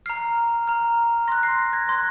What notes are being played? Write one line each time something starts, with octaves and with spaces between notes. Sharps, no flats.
A#5 F6 C7
A#5 F6
C6 F#6 A#6
C7
A#6
G#6
C6 F#6 A#6